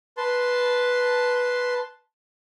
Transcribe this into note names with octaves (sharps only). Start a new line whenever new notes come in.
B4 A5 C6